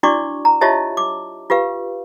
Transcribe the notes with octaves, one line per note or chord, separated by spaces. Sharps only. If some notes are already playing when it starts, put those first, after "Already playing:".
D4 E4 F#4 D5 C#6 D6
A#5
F4 G4 C#5 D#5 E5 A5
D6
F4 G4 B4 F5